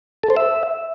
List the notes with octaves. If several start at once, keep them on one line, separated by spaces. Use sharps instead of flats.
A4
C5
E5